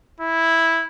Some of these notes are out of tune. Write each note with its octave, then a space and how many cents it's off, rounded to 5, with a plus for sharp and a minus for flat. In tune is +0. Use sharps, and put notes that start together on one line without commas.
E4 -5